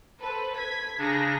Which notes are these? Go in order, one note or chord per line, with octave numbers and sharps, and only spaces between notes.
A4 B4 C5
G#6 B6
C#3 D4 G#4 A#5 A#6